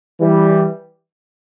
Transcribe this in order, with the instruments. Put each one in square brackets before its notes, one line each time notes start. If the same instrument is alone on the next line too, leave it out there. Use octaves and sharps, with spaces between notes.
[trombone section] E3 G3